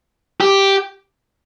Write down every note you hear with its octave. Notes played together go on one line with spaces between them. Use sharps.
G4